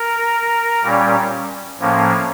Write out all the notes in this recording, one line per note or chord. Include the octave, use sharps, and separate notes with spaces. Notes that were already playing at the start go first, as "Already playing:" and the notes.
Already playing: A#4
A#2 G3 C#4
A2 F3 A#3 C#4